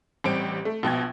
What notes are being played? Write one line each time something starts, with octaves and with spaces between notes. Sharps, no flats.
A1 G3 C4 G4 D7
A3
A#1 B2 G5 G#6